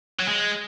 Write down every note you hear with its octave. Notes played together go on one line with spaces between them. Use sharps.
F#3
G#3